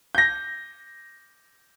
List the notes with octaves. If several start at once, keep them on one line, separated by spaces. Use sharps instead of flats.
G6 A#6